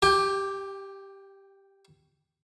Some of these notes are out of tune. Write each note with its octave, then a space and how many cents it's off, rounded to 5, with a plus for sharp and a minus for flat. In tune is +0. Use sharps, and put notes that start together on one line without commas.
G4 +0 G5 +30